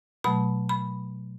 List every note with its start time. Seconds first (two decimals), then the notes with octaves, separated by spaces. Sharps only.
0.24 B2 F#3 A3 B5
0.69 B5